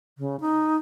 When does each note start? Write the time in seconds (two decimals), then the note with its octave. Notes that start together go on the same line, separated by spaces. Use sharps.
0.18 C#3
0.40 D#4